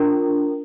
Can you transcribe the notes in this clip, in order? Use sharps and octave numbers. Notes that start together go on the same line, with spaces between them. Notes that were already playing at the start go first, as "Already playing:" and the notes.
Already playing: D4 F4 A#4